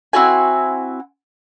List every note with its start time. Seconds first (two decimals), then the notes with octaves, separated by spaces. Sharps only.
0.13 C4 E4 F#4 G#5